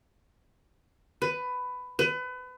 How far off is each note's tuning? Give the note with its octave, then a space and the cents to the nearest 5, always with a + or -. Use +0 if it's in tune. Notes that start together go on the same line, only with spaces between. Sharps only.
B4 +15
B4 +30